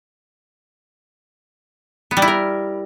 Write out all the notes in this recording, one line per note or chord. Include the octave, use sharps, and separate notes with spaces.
B3
G3
E4
A#4